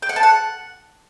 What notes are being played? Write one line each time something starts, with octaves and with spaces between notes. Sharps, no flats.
G5
F#5
A5
F#5